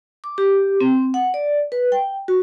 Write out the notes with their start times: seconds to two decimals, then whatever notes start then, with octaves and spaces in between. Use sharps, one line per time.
0.24 D6
0.38 G4
0.81 C4
1.14 F#5
1.34 D5
1.72 B4
1.92 G5
2.28 F#4